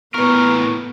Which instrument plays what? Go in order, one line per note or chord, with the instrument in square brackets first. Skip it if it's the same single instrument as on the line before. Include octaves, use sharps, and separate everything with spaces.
[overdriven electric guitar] A2 A#4 [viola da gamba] B3 [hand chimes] B4 C#6